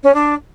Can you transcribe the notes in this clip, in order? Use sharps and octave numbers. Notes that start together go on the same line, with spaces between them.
C#4
D4